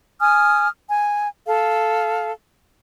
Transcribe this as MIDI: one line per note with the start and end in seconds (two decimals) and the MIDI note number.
0.20 0.67 80
0.20 0.67 87
0.20 0.67 89
0.90 1.28 80
1.45 2.32 69
1.45 2.32 77